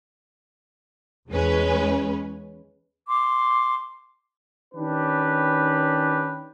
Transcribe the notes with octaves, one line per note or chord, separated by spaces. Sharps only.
E2 G#3 C#4 B4
C6 D6
D#3 C#4 D4 G4 B4